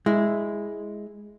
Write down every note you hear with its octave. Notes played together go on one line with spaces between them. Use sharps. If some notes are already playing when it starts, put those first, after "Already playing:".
G#3 E4